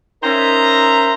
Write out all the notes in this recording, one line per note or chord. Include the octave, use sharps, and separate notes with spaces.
C#4 D#4 A#4 C5 E5 A#5